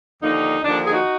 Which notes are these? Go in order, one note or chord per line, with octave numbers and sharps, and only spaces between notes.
D#2 D3 F3 A#3 D#4
D#2 D3 F3 A#3 D4
G#4
D#4 F#4